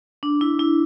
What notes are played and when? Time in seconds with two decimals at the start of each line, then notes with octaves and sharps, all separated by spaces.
0.23 D4
0.41 E4
0.59 E4